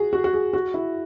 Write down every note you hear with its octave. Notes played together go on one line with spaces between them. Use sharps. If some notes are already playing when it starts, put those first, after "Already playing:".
Already playing: F#4 G#4
F#4
F#4
G#4
F#4
E4